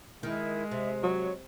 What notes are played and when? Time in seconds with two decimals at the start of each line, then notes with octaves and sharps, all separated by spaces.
0.23 D#3 G#3 E4
0.71 C3 E5
1.03 F#3 C#5